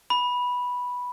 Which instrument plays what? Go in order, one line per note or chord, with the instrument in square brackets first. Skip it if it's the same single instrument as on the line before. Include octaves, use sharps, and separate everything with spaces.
[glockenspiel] B5